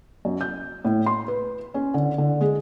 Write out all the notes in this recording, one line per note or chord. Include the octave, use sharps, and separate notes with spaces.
F#2
G6
A2
C6
B4
C#4
D3
D3
G#3